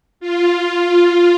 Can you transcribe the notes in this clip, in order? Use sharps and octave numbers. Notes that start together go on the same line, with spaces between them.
F4